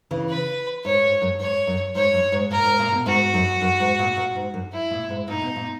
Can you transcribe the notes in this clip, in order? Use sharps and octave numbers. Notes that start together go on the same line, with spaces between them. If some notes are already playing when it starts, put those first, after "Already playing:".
C#3 E3
B4
G#2 C#5
G#2
F#2
G#2 C#5
F#2
G#2 C#5
F#2
G#2
A#2 A#4
G#2
A#2
B2
G#2 F#4
F#2
F#2
G#2
A#2
A#2
G#2
F#2
E4
A#2
G#2
A#2 D#4
B2
A#2